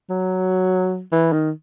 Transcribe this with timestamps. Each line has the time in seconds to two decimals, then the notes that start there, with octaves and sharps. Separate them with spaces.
0.10 F#3
1.12 E3
1.32 D#3